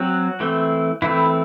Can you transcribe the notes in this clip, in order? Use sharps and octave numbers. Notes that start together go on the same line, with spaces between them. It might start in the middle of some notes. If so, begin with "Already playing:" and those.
Already playing: F#3 C4 F#4
E3 A3 C4
E3 A3 C4 E4